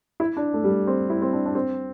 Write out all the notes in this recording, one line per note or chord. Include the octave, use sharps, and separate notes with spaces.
E4
D4
A3
G3
A3
C4
E4
C4
D4
D4
C4